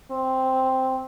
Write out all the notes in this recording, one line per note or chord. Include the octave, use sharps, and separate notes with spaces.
C4